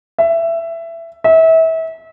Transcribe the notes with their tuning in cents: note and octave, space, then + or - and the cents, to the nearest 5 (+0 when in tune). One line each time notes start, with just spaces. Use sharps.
E5 +15
E5 -30